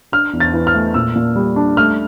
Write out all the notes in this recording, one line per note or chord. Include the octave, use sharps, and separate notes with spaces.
D4 F6
E2
A6
E3
F6
A3
A#2 E6
A#2
G3
D4
A3 F6